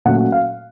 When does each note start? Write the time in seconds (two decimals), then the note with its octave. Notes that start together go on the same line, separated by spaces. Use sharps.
0.05 A#2 F#3 A3 C#4 F#5
0.32 F5